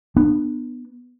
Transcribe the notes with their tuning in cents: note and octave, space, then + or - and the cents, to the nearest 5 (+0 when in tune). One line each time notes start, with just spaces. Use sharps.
B3 +0 D4 +35